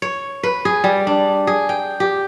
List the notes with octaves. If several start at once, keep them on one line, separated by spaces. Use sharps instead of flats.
C#5
B4
G#4
G3
D4
G#4
G5
G4